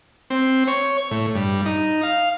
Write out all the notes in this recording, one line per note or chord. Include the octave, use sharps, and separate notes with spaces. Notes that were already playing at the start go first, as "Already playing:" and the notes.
C4
C#5
A2
G2
D#4
F5